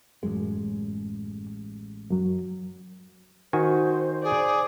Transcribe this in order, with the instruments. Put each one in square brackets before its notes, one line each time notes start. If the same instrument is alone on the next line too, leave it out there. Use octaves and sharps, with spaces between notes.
[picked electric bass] A1 G#3 [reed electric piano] F#2
[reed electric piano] F#2 F#3
[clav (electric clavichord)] D#3 F#4 G#5 [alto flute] C5
[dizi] G#4 [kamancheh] D5